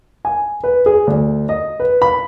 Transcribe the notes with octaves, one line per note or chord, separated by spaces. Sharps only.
G#5
B4
G#4
D2
D#5
B4
B5